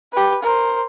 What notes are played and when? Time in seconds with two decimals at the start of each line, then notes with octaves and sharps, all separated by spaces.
0.12 G4 B4
0.43 A#4 C5